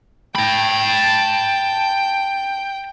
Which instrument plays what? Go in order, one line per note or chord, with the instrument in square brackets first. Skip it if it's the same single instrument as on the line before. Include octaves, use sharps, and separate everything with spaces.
[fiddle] G5 [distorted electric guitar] A5 B5